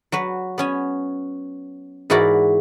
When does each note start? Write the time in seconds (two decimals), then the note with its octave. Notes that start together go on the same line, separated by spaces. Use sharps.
0.12 F#3 F#4 B4
0.58 B3 C#4 G#5
2.10 G#2 E3 E4 F#4 A#4 D5